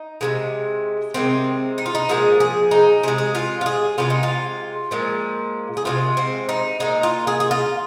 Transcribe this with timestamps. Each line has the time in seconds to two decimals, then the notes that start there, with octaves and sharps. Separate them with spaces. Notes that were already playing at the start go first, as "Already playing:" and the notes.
Already playing: D#4
0.21 C3 D#3 G#3
1.14 C3 D#3 G#3 C4
1.78 D#4
1.86 F4
1.95 D#4
2.09 A#2 F3 G#3 G#4
2.40 G#4
2.71 D#4
3.03 C3 G#4
3.08 G#3
3.18 G#4
3.35 F4
3.61 F4
3.66 G#4
3.98 C3 D#3 G#3 F4
4.10 D#4
4.23 F4
4.91 A#2 F3 G#3
5.77 G#4
5.85 C3 D#3 G#3 F4
6.17 C4
6.49 D#4
6.80 A#2 G#3 D#4
7.03 F4
7.27 G#4
7.40 G#4
7.51 F4